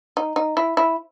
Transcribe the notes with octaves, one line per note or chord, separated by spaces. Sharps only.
D#4
D#4
E4
E4